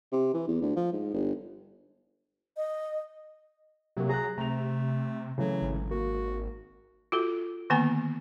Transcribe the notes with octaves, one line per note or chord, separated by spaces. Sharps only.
C3
E3
E2
D2
F3
G#2
G1
D#5
C3 F#3 A#3
G#4 A#5 F#6
C3 A3 A#5 F7
C#3 E3 F#3 A3
G#1
A#3 F#4
F4 F#4 A4
D3 D#3 A#3 B3 G#5 A#5